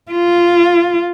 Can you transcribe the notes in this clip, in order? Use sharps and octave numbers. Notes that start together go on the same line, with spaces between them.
F4